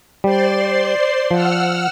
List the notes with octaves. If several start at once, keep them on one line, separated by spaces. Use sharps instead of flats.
G3 C5 D5 C6
F3 F#5 E6 F6